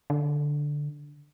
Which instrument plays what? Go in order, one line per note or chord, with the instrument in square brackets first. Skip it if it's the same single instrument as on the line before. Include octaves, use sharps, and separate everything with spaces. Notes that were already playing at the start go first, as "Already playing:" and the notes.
[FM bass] D3